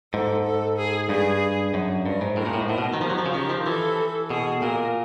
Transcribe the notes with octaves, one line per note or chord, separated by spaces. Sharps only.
G#2 A4
A4
G#4
G2 G#4
F#2
G2 A#4
G#2
A2 A#4
A#2
A2
G#2
A2 A#4
B2
D#3
F3 G4
F#3
F3
C#3
D#3 G4
F3
E3 A4
B2 G#4
A#2 A#4